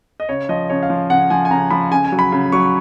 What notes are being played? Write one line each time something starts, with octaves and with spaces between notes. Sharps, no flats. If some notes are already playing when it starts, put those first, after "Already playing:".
D#5
C#3 C#5
F3 D#5
C#3 C#5
F5
F3
C#3 F#5
F3 G#5
G#5
C#3 A#5
F3 B5
C#3 G#5
G#5
F#3
B5
C#3
F#3 C#6